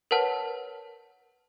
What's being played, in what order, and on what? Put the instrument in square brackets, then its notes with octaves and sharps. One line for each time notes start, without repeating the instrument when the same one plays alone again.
[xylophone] A#4 B4 C#5 F#5 A5 F6